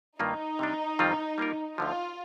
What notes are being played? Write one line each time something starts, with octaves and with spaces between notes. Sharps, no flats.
G2 D#3 A#3 D#4 F4
C3 G3 D4
F2 D#3 G3 C4 F4
G3 A#3 F4 A#4
D2 D3 F3 F4